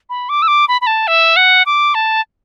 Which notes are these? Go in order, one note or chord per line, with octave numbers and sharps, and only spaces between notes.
B5
D6
E6
D6
B5
B5
A5
E5
F#5
D6
A5